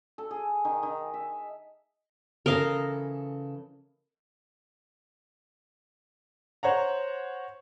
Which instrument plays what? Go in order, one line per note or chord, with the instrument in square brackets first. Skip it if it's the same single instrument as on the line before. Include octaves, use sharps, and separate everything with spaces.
[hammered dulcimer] A4
G#4
D#3
D#3
E5
[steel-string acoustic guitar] C#3 E3 A4 [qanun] A#4 D#5 F5
[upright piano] C5 C#5 F#5 A#5